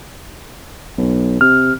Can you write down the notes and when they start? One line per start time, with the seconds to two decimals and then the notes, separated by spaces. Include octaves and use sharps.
0.98 B1
1.41 C3 F6